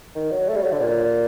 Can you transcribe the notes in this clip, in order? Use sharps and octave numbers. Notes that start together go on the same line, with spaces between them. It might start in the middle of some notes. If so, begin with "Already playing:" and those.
D#3
F#3
A3
G3
F#3
D3
A#2